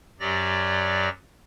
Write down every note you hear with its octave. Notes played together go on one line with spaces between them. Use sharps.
F#2 F#3 G4 D5 A#6